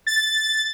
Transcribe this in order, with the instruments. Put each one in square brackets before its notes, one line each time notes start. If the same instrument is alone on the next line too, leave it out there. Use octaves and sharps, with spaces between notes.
[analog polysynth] A6